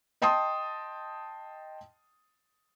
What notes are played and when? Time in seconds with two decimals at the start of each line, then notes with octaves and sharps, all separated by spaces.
0.22 D#5 G5 A5 C6 D#6